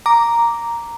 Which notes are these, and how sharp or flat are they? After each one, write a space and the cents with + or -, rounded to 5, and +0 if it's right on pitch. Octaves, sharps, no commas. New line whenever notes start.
A#5 +0 D6 -5